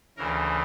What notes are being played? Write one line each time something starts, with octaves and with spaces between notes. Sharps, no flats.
D2 C#3 E3 A#4